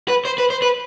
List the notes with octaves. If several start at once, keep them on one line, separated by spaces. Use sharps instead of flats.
B4
C5
B4
C5
B4